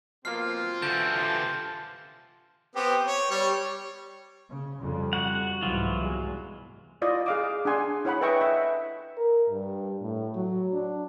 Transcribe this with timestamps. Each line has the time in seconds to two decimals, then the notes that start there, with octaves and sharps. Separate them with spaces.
0.25 B2 F3 A#3 C4 F4 F6 C7
0.82 D3 E3 F#4 A5 G6
1.16 F4 G4 C5 A5
2.76 B3 C4 G4
3.06 C#5
3.31 G3 C#5
4.50 C#3
4.81 F2 C#3 G3
5.13 F#4 F#5
5.62 C2 G#2 E3 F#3 F4
5.99 E2 G#3
7.02 E4 F4 D5 D#5
7.26 G#4 F5 D6
7.65 D4 G#4 F#5 G#5 C6
8.05 E4 C#5 F#5 B5
8.21 B4 D#5 E5 G5 G#5 C#6
8.41 E5
9.17 A#4
9.50 G2
10.02 A2
10.35 F#3
10.73 D4